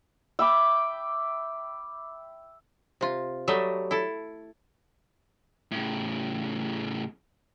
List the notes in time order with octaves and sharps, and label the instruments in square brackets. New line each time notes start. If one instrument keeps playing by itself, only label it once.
[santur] E5 G5 B5 D6
[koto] C3 F4
F#3 G3 A3 A4 D#5 E5
E4 A4
[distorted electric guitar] A2 C#3